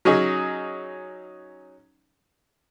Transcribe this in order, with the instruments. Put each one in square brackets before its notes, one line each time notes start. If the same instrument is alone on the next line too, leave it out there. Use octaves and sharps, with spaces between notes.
[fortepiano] F#3 C#4 D#4 G#4